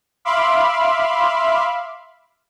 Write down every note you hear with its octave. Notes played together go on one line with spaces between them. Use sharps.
E5 F5 B5 C6 D6